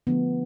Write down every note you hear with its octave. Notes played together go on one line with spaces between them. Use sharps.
D3 F3 A3 B3